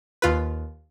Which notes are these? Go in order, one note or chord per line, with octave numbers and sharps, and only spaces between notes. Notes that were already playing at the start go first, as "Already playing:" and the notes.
D#2 F4 B4